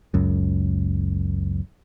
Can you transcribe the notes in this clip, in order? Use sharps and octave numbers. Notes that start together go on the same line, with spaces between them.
F#1 C#2 F#2